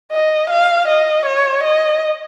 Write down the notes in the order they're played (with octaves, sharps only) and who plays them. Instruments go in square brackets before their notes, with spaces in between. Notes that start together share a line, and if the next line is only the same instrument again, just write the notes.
[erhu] D#5
F5
D#5
C#5
D#5